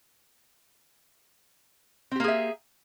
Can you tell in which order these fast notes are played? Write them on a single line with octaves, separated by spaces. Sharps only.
C4 G4 A#3 G#4 E5